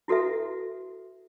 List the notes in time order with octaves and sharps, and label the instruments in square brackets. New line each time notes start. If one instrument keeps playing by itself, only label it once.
[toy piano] E4 F#4 A4 B4 E5